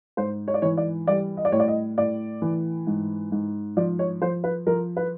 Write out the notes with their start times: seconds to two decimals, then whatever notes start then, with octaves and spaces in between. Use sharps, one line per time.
0.17 G#2 C5
0.48 C#5
0.54 D5
0.62 E3 C#5
0.77 D5
1.07 G3 D5
1.37 D#5
1.45 D5
1.52 A2 C#5
1.60 D5
1.68 D#5
1.98 A2 D5
2.42 E3
2.87 G#2
3.32 G#2
3.77 F3 D5
3.99 C#5
4.22 F3 C5
4.44 B4
4.66 F3 A#4
4.97 B4